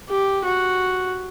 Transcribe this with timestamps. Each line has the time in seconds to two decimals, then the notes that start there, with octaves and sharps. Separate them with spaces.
0.10 G4
0.45 F#4